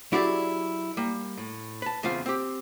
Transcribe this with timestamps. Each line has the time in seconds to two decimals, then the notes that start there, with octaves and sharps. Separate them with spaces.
0.12 F#3 E4 G4 G#4 B4 D5
0.97 G3 A#3
1.37 A2
1.82 B4 A5
2.03 E2 C#3 C4 F4 F5
2.26 C4 G4